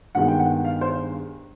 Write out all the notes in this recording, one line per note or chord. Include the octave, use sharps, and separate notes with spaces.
G2 D#3 G#3 B3 F#5
G5
F#5
F5
C5